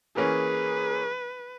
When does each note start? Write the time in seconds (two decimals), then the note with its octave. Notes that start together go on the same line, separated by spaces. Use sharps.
0.16 E3 A#3 C#4 G#4 B4